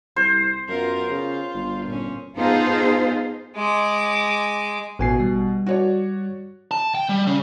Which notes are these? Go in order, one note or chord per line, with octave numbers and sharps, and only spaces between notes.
C2 C5
F#2 B3 F4 A#4
C#3 F4
G1
A#2 C#4
B3 D#4 F4 G#4 A4 C5
G#3 D6
A1 B2 G#5 C7
G3
F#4 C#5 D5
A5
G5
G3
C#3